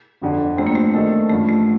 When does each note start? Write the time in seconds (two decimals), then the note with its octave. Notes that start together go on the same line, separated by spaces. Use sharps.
0.21 G1 F2 D3
0.57 G1 G2 F3 A3 C4
0.67 A#3
0.75 A3
0.94 D#3 A3 D4 A4 D#5
1.30 A1 G2 F3 A3
1.48 A3